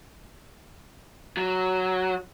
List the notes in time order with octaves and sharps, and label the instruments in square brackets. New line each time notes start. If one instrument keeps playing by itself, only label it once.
[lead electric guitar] F#3